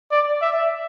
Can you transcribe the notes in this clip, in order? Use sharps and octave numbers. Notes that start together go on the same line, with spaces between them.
D5
E5